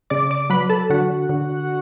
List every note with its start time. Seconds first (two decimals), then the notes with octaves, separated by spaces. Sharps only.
0.10 C#3 D5 D6
0.31 D5 D6
0.50 F#3 B4 B5
0.70 A4 A5
0.90 D3 F#4 F#5
1.29 D3